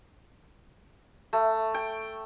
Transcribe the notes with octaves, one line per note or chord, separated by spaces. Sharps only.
A3
G5